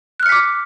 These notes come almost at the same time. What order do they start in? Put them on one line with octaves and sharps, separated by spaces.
F#6 F6 C#7 B6 D6